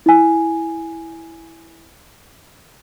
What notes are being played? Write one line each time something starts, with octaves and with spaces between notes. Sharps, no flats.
E4 G#5